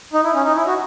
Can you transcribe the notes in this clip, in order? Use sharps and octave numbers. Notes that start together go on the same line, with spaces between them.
D#4
E4
C#4
D#4
E4
F#4